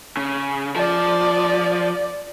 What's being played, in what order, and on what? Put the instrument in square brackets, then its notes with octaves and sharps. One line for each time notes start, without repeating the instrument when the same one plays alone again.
[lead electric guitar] C#3
[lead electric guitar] F3 [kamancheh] D5